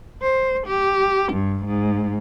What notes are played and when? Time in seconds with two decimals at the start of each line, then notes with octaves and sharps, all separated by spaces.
0.22 C5
0.67 G4
1.33 G2
1.66 G#2